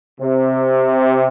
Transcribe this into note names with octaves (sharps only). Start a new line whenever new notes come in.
C3